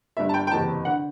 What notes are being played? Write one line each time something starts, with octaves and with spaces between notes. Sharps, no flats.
G1 G2 D3 E5
A5
G5
G5
F#1 E2 C3 E3 A5
D3 F#5